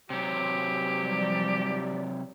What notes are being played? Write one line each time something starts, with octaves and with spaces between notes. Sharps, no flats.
C3 F#3 G4
F3 G3 D5